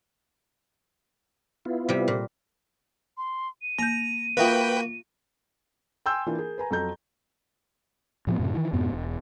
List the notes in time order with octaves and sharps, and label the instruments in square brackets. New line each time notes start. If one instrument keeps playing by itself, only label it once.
[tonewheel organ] B3 E4 F4
[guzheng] C3 G3
A#2
[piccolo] C6
D#7
[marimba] A#3 G6 [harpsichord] A#5
[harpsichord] A#3 F#4 [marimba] F4 E5 F5 [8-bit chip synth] B4 G5
[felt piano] G5 G#5 C6 E6 G6
E3 A#3 D4 F4
G#4 A#4
B4 G#5 A#5
F2 F#3 A4 A#5 G6
[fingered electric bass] A2 F3 G#3 B3
F#2 A2 C3
D#3 E3
F2 G#2 B2 B3
E1